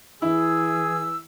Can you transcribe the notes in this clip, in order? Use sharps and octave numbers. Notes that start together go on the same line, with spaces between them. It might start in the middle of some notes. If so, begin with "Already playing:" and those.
E3 E4 G#4 E6